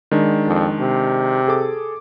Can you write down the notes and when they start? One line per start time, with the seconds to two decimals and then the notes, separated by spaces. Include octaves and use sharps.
0.11 D#3 G#3 D4
0.47 F2
0.80 C3
1.47 G#4 A4 D6